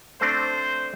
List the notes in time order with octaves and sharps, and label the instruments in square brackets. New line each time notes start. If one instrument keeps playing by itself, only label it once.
[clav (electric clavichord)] A3 C4 D4 [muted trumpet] C5